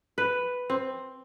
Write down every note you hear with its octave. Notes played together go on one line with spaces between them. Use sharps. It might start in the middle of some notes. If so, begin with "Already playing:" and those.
B4
C4